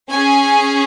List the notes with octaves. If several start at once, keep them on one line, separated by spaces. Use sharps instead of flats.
C#4 G#4 G#5